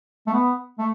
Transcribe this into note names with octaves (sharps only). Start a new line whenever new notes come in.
A3
B3
A3